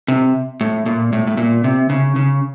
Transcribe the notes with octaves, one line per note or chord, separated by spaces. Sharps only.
C3
A2
A#2
A2
A2
A#2
C3
C#3
C#3